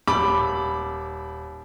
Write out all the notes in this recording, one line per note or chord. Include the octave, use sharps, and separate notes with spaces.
D#1 B5 D6